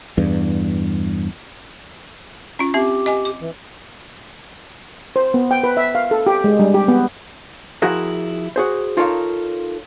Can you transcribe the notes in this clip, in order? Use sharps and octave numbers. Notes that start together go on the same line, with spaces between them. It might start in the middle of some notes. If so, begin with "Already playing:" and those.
E2 G2
C#4 F4
C4 G4 E5
D#5 G#5
D6
E3
C5
B3
G5
B4
E5
F5
A4
G4
G#3
G3
G4
B3
F3 E4 F#4 G#4 A#4
F#4 G#4 C5
D#4 F4 A4 A#4 C#5 F5